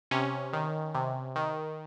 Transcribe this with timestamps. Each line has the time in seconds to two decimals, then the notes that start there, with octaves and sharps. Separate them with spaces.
0.11 C3 C#4
0.53 D#3
0.95 C3
1.36 D#3